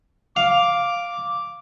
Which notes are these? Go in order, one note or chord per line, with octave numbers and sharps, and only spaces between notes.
F5 D6